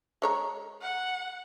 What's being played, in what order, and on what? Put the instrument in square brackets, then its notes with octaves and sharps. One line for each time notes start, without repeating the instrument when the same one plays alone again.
[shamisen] G#3 C#5 A#5
[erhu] F#5